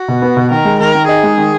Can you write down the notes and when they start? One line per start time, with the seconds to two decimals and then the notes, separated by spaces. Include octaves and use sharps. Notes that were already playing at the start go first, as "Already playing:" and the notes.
Already playing: F#4
0.08 B2
0.22 B3
0.37 B2
0.51 D#3 A#4
0.65 G#3
0.80 D#3 A#4
0.95 D#3
1.08 D#4 G#4
1.23 G#3
1.38 D#3